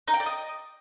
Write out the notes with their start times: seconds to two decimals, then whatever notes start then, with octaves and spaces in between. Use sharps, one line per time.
0.08 D#4
0.14 G5
0.20 D5
0.26 D#5